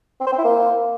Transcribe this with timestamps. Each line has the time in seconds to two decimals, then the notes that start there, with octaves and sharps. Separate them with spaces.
0.21 C4
0.27 C5
0.32 C4
0.38 E4
0.44 A#3